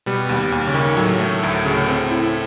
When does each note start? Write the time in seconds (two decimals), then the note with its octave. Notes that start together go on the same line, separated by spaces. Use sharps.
0.06 B2 G3
0.29 D#2
0.52 D#2
0.67 C#3
0.74 D#3
0.97 A2 F#3
1.20 A3
1.43 D2
1.65 C#3
1.88 C4
2.11 E4